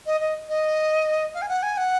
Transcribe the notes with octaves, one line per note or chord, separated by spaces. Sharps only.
D#5
D#5
D#5
F5
G#5
F#5
G#5
F#5